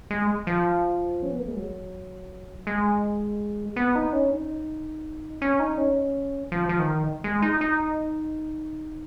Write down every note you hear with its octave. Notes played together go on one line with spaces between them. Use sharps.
G#3
F3
C#4
B3
A#3
G#3
F#3
G#3
B3
D#4
C#4
D#4
C#4
D#4
C#4
F3
F3
D#3
G#3
D#4
D#4